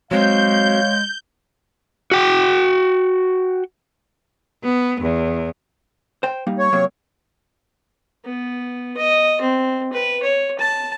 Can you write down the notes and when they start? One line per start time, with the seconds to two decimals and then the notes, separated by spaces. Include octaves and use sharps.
0.11 F#3 G#3 C4 C#5 F5 G6
2.11 F#4 G5
4.64 B3
5.00 E2
6.23 C5 G5
6.47 G3 A#3 D#4
6.59 C#5
6.73 C3 F#3 A#3
8.25 B3
8.97 D#5
9.41 C4
9.93 B4
10.23 C#5
10.59 A5